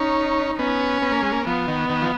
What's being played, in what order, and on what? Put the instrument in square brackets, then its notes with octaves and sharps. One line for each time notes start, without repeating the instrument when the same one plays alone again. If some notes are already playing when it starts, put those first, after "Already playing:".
Already playing: [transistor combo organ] C#4 [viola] D#4
[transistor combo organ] B3 [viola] C#4
[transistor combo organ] B3
A#3
G#3
A#3
[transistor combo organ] F3 [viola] B3
[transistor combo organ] D#3
D#3
F3